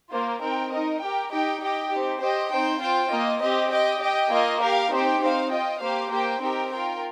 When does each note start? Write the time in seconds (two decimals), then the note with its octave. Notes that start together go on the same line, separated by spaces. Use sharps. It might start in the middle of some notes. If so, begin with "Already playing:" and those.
0.10 A#3 F4 C5
0.41 C4 D#4 A#4 G5
0.71 D#4 A#4 D#5
1.01 G4 A#4 G5
1.31 D#4 G4 D#5 G5
1.61 G4 D#5 G5
1.90 C4 D#4 G4
2.21 G4 C5 D#5 G5
2.51 C4 D#4 C5 G5
2.80 F4 C5 G5
3.11 A#3 F4 D#5
3.41 C4 G4 D#5
3.70 G4 D#5 G5
4.00 G4 D#5 G5
4.30 A#3 F4 D#5
4.61 G4 A#4 F5
4.92 C4 D#4 G4 C5 G5
5.21 C4 D#4 C5 F5
5.51 F4 D#5 G5
5.81 A#3 G4 C5 F5
6.11 A#3 G4 C5 G5
6.41 C4 D#4 G4 A#4 G5
6.71 F4 A#4 G5